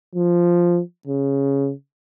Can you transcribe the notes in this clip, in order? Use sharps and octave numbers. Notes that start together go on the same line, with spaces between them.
F3
C#3